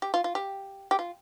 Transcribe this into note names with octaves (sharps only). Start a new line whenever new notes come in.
G4
F4
F4
G4
G4
F4